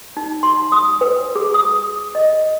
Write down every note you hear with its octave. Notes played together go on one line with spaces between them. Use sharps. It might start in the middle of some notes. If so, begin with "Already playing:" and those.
D#4
C6
D#6
B4
G#4
D#6
D#5